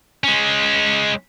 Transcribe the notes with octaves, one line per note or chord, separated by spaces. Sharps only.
G#3 C#4